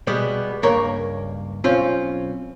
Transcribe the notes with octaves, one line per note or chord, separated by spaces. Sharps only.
B2 G3 G#3 B3
C#2 G2 A#3 A#4 C#5
B1 C4 C#4 F4